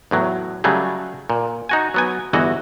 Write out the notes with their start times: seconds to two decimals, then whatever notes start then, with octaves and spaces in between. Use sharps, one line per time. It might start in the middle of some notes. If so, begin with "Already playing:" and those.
0.11 E2 A2 F#3
0.64 C#3 F#3 G3 A3 G#4
1.30 A#2
1.69 D#4 F#4 G#5
1.94 F#3 B3 G#5
2.33 G1 E2 E3 F#4 D#5